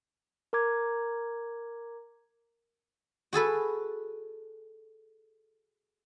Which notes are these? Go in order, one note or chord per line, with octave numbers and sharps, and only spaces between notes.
A#4 A#5 D6 G#6
F#4 G#4 A4 B4